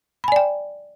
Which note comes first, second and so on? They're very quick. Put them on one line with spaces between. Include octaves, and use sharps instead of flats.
B5 G#5 D5 G5